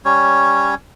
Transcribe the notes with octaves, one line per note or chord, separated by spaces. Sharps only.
G3 C#4 C#5